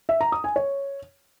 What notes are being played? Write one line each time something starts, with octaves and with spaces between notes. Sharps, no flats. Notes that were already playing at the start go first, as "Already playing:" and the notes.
E5
A#5
D#6
G#5
C#5